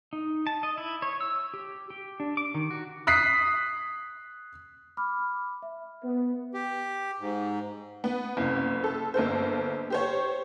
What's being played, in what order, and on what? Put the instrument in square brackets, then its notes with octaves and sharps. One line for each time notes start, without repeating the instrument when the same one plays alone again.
[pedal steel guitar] D#4
A5
D#5
E4
C#5
E6
G4
G4
D4
D6
D#3
F#4
[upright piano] D#6 F#6 B6 C7
[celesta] B5 D6 F6
E5
[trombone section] B3
[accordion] G4
G#2
[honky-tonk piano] B3
F#1 C2
A4
G1 A#3 A4 C5
G4 C5 C#5